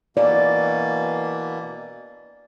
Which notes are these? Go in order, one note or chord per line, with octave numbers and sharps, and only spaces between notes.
B2 E3 A#3 D5